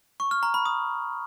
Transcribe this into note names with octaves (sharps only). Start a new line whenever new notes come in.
C#6
F6
A#5
B5
D#6